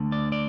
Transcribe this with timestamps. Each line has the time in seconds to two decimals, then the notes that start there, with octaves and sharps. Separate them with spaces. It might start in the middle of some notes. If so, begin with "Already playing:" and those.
Already playing: D2 D3 A3
0.12 D5
0.32 D5